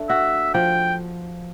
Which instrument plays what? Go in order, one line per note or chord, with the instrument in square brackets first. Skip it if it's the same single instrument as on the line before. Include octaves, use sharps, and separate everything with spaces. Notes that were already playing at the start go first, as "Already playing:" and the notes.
Already playing: [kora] A3 D4
[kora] F#4 [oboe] E5
[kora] F3 [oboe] G5